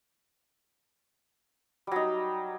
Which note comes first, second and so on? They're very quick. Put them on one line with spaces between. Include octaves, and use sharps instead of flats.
G3 F#3 D#4